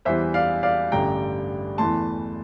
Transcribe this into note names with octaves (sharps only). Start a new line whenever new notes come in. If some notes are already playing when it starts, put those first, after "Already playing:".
E2 E3 G3 C5 E5
D5 F5
D5 F5
A1 G2 D3 G3 G5 A#5
E2 E3 A3 A5 C6